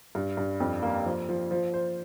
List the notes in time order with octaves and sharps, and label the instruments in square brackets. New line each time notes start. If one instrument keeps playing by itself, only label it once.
[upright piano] G2
G2
F2
A#3
F3
F3
F3
C5